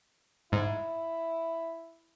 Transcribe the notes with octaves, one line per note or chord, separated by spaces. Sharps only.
G#2 E4